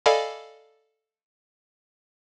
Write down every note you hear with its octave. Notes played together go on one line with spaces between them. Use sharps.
A4 D5 D#5 F5 G#5 B5